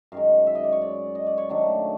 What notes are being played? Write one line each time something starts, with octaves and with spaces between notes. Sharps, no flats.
F#2 D#3 G#3 F5
E5
D#5
D5
C#5
D5
D#5
D5
C#5
D#3 F#3 A3 D4